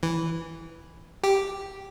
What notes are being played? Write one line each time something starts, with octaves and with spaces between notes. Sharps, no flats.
E3
G4